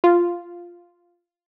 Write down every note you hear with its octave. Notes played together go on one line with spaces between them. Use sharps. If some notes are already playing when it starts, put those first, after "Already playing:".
F4